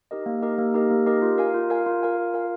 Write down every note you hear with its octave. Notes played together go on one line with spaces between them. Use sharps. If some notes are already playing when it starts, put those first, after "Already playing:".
D#4 G4 A#4 D#5
A#3
D#4 G4 A#4 D#5
A#3
D#4 G4 A#4 D#5
A#3
D#4 G4 A#4 D#5
F4
A#4 F5 G#5
F4
A#4 F5 G#5
F4
A#4 F5 G#5
F4
A#4 F5 G#5